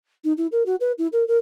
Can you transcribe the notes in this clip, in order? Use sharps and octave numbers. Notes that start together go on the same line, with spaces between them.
D#4
E4
A#4
F#4
B4
E4
A#4
A#4